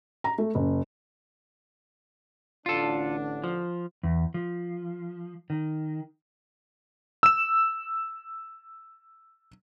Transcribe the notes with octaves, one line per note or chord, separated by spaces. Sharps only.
A#5
A3
F#1
A1 D3 D4 F4 A4
F3
E2
F3
D#3
E6 E7